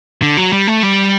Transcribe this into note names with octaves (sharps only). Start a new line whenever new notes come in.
D3
F#3
G3
A3
G3